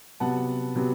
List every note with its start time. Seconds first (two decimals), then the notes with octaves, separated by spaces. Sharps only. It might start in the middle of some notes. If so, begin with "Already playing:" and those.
0.20 C3 F#3 B3 F#5 A5
0.75 C3 F#3 B3